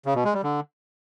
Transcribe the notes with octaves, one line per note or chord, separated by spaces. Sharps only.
C#3
B2
G#3
G3
D3